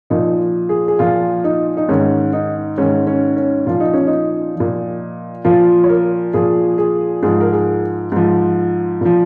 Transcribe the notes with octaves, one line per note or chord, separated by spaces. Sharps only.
A#2 F3 D#4
G#4
G#4
A#2 F3 F4
D#4
D#4
G#2 D#3 C#4
D#4
G#2 D#3 C#4
C#4
C#4
A#2 F3 F4
D#4
C#4
D#4
A#2 F3
A#2 F3 F4
C#5
A#4
A#2 F3 G#4
G#4
G#2 F3 G#4
A#4
G#4
G#2 F3
A#2 F3